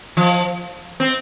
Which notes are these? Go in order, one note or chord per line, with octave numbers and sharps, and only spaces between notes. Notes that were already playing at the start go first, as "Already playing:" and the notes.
F3
C4